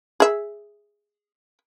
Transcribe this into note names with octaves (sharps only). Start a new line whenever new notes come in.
G#4 E5